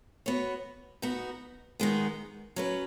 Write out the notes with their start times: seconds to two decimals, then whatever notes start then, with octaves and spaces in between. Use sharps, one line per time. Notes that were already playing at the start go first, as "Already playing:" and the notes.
0.26 B3 F#4 C#5
1.02 B3 D#4 F#4
1.80 D#3 G#3 B3
2.56 F#3 C#4 B4